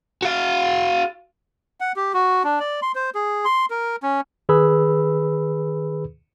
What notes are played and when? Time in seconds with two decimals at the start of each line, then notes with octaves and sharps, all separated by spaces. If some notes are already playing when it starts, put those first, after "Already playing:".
0.23 F#4 F5
1.80 F#5
1.96 G4
2.14 F#4
2.44 D4
2.60 D5
2.82 C6
2.95 C5
3.15 G#4
3.45 C6
3.70 A#4
4.03 C#4
4.49 D#3 G#4 B4 B5 E6